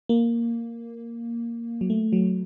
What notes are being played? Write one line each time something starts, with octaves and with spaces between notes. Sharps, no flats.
A#3
F#3
A3
F#3